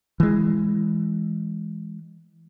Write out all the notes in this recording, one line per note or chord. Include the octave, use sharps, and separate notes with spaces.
E3 G#3